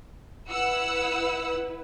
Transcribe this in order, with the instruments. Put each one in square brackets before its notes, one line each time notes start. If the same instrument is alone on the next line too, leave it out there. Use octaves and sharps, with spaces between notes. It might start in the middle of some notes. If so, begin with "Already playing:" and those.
[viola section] E4 B4 [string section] F#5 E6